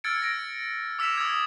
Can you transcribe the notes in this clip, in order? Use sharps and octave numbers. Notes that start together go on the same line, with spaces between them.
E6 F6 G#6 A6 C#7 D7
A#6 D7
D6 E6 B6 E7 F7
D#6 G#6